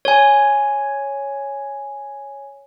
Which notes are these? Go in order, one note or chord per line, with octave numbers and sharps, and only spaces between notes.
C#5 G#5